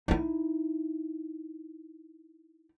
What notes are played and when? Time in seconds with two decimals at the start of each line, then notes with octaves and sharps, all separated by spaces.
0.08 D#4 E4